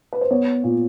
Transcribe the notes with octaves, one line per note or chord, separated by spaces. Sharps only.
B4
C5
B3 C#5
A#2